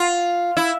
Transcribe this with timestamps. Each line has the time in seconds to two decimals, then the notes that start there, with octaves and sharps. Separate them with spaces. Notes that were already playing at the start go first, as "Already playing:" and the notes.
Already playing: F4
0.57 E4